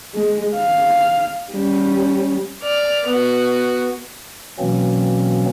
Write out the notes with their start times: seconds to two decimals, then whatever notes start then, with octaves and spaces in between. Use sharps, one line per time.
0.15 G#3
0.56 F5
1.53 G3 C#4
2.63 D5 F6
3.07 B3 F#4
4.59 B2 E3 F#3 A#3 C4 C#4